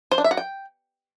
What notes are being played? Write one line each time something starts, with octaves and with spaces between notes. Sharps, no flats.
C5
D4
E5
F#4
G5